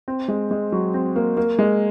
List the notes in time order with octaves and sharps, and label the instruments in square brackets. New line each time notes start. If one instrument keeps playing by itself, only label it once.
[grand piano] C4
G#3
G#3
F#3
C4
A#3
A#3
G#3